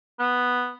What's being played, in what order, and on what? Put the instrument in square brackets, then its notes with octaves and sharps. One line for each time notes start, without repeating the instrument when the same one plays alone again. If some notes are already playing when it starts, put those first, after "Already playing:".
[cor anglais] B3